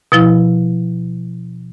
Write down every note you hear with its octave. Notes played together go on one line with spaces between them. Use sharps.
B2 F3 E4